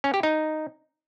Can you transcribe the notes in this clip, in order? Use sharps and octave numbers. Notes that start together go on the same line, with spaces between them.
C#4
G4
D#4